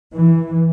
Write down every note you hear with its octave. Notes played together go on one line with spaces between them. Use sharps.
E3